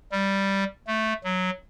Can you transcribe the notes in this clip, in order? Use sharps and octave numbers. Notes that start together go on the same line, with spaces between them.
G3
A3
F#3